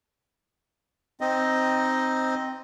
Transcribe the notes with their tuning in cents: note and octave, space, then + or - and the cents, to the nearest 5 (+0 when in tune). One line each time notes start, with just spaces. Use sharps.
C4 +0 D#4 +0 D#5 +0